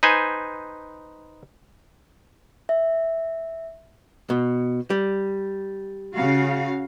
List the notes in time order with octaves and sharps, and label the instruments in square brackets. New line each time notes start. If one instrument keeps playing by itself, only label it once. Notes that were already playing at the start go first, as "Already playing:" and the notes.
[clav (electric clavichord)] D#4 B4 C5 G#5
[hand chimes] E5
[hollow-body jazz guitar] B2
G3
[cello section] C#3 F#4 F5